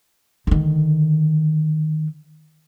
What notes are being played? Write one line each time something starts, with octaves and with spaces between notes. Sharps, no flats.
D3 D#3